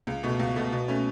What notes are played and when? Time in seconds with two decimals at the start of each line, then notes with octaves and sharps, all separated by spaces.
0.07 C#2
0.23 B2 A3
0.39 C#2
0.56 B2 A3
0.72 B2
0.88 A3 C#4